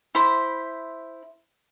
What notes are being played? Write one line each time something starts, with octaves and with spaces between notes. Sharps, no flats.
E4 C5 B5